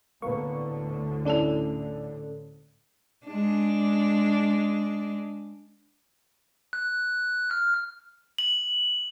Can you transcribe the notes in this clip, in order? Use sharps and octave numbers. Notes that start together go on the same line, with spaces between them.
D2 A2 D3 A#3 B3 C#6
A3 C#4 D4 E4 A4 F7
G#3 D4
F#6
F6
F#7